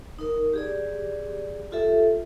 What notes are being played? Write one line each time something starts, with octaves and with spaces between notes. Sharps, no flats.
D#4 A#4
G4 G#4 D5
F4 G4 A4 E5